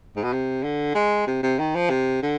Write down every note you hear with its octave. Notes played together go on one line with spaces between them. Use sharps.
G#2
B2
C3
D3
G#3
C3
C3
D#3
F3
C3
D3